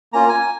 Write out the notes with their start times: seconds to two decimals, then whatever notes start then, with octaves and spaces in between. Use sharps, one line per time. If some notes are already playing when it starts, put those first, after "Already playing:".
0.13 A#3 C#4 F4 A#5
0.29 G#5